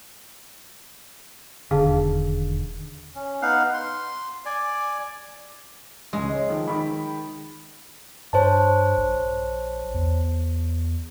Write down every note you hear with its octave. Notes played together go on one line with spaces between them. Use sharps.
E1 D#2 D3 G#4 F5 A5
C#4
B3 D#4 F5 F#5
C6
D5 G#5
C#2 G#3
C#5 D#5
D#3 F3
D#3 B5
G2 C5 C#5 A5
A#1
E2